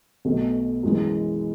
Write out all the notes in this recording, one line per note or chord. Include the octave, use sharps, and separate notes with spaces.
B1 B2 A3
F#2 E3 G#3